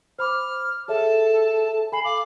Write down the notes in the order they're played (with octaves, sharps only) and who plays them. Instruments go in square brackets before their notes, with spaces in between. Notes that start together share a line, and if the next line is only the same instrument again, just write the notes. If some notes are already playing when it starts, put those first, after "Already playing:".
[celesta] C5 B5 D6 [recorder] F6
[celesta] G#4 C#5 E5 [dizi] A4 [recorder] A5
[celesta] A4 G#5 C7 [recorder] B5
[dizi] F5 [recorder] D6 [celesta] F#7